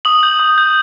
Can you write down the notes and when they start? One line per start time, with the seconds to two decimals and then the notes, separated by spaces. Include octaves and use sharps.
0.05 D#6 F#7
0.23 G6
0.39 D#6
0.58 G6